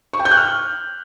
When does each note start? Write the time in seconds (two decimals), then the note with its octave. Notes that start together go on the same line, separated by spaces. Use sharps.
0.13 C#6
0.19 G5
0.25 G6
0.31 F#6
0.37 F6